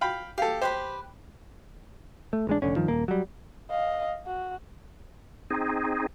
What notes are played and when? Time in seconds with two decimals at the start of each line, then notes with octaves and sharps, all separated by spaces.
0.01 F5 G5 B5
0.38 G4 A4 F5
0.62 G4 B4 C5 B5
2.33 A3
2.47 A1 G#3 D4
2.62 F1 D3 C#4
2.76 G2 D#3 F3
2.88 D#1 A#3
3.08 F#3 G3
3.70 D#5 F5
4.26 F#4
5.50 C4 D#4 G#4